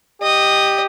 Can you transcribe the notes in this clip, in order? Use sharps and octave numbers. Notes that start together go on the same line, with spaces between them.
G4 D#5